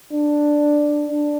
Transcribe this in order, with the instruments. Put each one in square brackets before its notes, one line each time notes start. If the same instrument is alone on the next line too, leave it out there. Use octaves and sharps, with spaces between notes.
[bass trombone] D4
D4